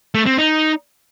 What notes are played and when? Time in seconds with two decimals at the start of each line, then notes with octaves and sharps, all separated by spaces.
0.15 A3
0.26 C4
0.38 D#4